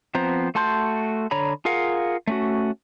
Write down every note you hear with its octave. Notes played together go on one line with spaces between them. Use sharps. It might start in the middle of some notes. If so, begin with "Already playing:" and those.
F3 B3 C4 C5 A#5
A3 F#4 A5 C6 G6
D3 C#5 A#5 B5
F4 G#4 A#4 F5 F#5
A3 C#4 F#4